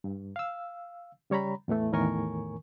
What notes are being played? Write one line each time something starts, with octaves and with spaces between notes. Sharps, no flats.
G2
F5 E6
C#3 G3 C#5 A#5 B5
E2 A2 E3 A3
E2 A2 D#3 A#4 G#5 C#6